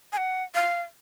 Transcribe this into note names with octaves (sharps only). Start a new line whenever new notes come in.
G#5
F#5
F5